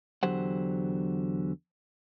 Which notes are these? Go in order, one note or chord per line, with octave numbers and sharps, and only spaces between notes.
E2 D3 F#3 G4 C5 F#5